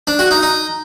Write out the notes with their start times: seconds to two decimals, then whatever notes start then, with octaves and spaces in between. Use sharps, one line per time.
0.07 D4
0.19 F#4
0.31 D#4
0.43 D#4